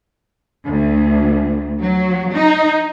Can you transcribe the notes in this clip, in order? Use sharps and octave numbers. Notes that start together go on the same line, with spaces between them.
D2
F#3
D#4